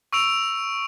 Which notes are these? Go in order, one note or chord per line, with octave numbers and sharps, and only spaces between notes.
C#6 E6 D7 F7